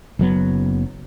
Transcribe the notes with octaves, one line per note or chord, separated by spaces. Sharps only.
F#1 F#3 B3